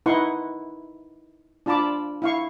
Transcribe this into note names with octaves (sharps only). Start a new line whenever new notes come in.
D#4 E4 B4 F#5 C6 C#6
D4 F4 A5 B5 D6
E4 F5 C#6